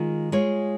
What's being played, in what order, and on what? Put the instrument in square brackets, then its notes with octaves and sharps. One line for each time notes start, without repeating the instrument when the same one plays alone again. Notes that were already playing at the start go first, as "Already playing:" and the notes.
Already playing: [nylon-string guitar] D#3 G#3 F4
G#3 F4 C#5